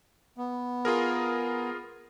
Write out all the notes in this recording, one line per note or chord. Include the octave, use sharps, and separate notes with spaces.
B3
F4 G#4 A#4